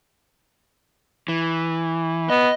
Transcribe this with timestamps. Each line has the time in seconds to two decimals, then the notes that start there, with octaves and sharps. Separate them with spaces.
1.28 E3
2.30 B3 D#5